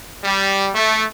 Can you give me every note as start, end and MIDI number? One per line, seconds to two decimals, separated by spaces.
0.24 0.69 55
0.75 1.04 57